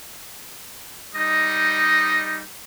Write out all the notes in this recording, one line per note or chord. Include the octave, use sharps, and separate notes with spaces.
G3 D#4 D#5